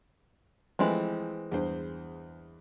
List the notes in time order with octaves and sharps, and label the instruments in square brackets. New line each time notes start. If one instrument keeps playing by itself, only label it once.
[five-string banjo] E3 G#3 C4 [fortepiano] F3 A3 E4
[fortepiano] E2 G2 C5